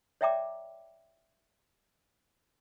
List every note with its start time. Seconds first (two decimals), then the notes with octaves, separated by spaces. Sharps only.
0.21 C#5 D5 E5 G5 A#5 D6